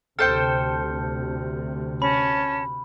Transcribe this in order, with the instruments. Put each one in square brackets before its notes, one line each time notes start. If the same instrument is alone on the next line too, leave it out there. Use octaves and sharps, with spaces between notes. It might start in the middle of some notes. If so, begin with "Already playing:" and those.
[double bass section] D2 C3 [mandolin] A4 C5 G5 [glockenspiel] F6 G6 C#7
[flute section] C#4 A5 [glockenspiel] B5